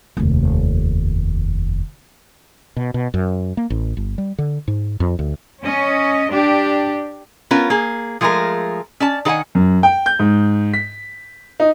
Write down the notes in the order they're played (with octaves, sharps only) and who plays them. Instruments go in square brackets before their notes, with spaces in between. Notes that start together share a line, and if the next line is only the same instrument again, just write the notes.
[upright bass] F1 D#2
[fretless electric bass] B2
B2
F#2
A#3
A1
G1
G3
D3
G#2
F2
D2
[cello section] C#4 D#5
D4 G4
[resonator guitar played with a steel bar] B3 C#4 F4 A#4
A#3 G#4
F3 G#3 A3 G#4 A#4
C#4 D5 A5
D#3 A4 B4 F#5 G#5
[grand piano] F#2
G5
G6
G#2
B6
D#4